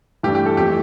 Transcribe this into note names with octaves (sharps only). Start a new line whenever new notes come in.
G2 E3 A3 D4 G4
G4
A4
F2 E3 A3 G4